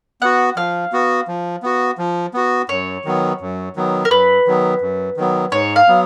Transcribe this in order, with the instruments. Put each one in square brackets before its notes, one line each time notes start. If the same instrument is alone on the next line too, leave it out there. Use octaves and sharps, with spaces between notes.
[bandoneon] B3 F#4 [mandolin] F#5
[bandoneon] F3 [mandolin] F5
[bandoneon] B3 F#4
F3
B3 F#4
F3
B3 F#4
[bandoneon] F#2 [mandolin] C#5
[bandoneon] D#3 F#3 B3
F#2
D#3 F#3 B3
[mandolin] A#4
[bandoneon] F#2 [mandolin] B4
[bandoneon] D#3 F#3 B3
F#2
D#3 F#3 B3
[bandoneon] G#2 [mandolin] C#5
[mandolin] F5
[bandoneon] F#3 B3